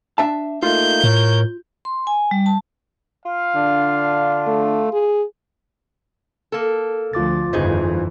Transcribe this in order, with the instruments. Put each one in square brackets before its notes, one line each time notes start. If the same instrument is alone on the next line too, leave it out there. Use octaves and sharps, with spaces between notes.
[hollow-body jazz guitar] D4 E5 A5
[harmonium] A3 A#3 D#4 [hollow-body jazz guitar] F4 [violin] G6
[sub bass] A2 [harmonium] A#4 C#5
[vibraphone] C6
G#5
G3
A5
[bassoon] F4 [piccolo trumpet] F5
[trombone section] D3 D4
[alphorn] A3
G#4
[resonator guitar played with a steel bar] A#3 A4
[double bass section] D2 F3 [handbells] F4 D6 A6
[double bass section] G1 F2 E3 [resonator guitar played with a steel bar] C#3 D#4 G#4 [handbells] F4 C5